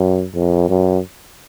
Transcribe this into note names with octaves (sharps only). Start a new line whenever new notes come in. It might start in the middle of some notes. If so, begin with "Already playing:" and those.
Already playing: F#2
F2
F#2